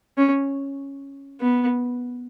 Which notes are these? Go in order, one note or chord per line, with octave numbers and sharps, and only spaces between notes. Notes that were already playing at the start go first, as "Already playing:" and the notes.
C#4
B3